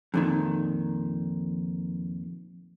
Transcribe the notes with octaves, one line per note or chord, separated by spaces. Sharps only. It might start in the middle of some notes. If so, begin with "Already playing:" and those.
F2 A#2 D#3